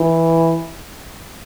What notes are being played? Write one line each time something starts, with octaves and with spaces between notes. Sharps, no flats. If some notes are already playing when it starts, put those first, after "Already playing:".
Already playing: E3